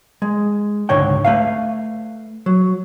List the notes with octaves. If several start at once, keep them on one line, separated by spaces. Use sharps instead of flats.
G#3
C#2 G#2 D3 C#5 G5
A3 B4 F5
F#3